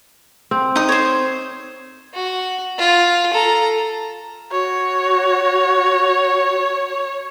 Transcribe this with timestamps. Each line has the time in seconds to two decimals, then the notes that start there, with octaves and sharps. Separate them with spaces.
0.51 C4
0.76 D#4 D#6
0.89 C5 C#5
2.14 F#4
2.78 F4
3.33 A4 A#5
4.51 F#4 C#5